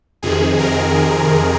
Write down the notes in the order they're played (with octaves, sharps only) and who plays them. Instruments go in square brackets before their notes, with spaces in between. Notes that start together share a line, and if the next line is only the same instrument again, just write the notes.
[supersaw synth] F2 C3 D#3 G#4
A#4